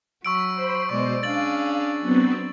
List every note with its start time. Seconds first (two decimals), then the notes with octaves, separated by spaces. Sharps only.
0.25 F#3 B5 C#6 E6 D7
0.54 C5 B5
0.89 B2 G#3 C5 D5 C#6
1.23 C#4 D4 G#4 F5 A6 F#7
2.00 F#3 B3 C4